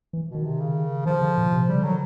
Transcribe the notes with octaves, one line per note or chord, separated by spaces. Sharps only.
E3
B2
D#3
C3
C#3
D#3 F3
D3
A#2
C3
C#3 G3
D3
D#3 F#3